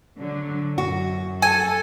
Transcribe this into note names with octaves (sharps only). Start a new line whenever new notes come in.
D3 F#3
F#2 F#4
A4 G#5